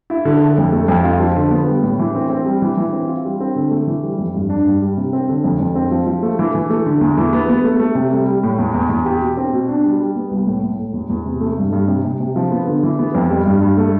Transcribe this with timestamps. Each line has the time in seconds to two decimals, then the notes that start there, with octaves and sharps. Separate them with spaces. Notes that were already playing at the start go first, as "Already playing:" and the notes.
0.10 E4
0.25 D3
0.42 A4
0.58 F2
0.72 A3
0.88 F2
1.04 F4
1.20 F3
1.36 D3
1.51 B3
1.67 G3
1.83 A2
1.99 E3
2.15 C4
2.30 C4
2.46 G3
2.62 E3
2.77 E3
2.92 C4
3.08 F4
3.24 G3
3.40 C4
3.56 D3
3.71 A3
3.87 E3
4.02 G3
4.18 F2
4.34 G2
4.50 D4
4.66 G2
4.82 G3
4.97 C3
5.13 C4
5.29 D3
5.44 F2
5.59 F2
5.75 C4
5.91 F3
6.06 F3
6.22 A3
6.39 E3
6.55 E3
6.70 A3
6.86 D3
7.01 E2
7.17 E3
7.33 B3
7.49 B3
7.64 A3
7.79 A3
7.95 C3
8.11 G3
8.27 G3
8.43 A2
8.58 E2
8.74 E2
8.89 E2
9.05 G4
9.21 B2
9.37 C4
9.53 B2
9.69 D4
9.84 G3
9.99 G3
10.15 B3
10.31 C2
10.47 A2
10.62 A2
10.79 A2
10.94 E2
11.09 E2
11.26 C3
11.41 A3
11.57 G2
11.72 G2
11.88 C3
12.04 C3
12.20 C3
12.36 F3
12.52 B3
12.67 D3
12.83 E3
12.99 B3
13.15 F2
13.30 G3
13.45 G2
13.62 G2
13.77 A3